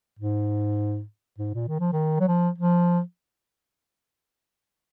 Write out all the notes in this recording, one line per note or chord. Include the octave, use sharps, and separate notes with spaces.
G#2
G#2
A#2
D#3
F3
D#3
F#3
F3
F3